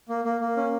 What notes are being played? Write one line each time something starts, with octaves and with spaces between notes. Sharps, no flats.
A#3
A#3
A#3
C#4